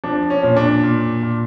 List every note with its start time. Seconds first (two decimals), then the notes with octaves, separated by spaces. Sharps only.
0.04 F3 D4
0.30 C#4
0.43 A#2
0.57 D4
0.83 A#2
1.23 A#2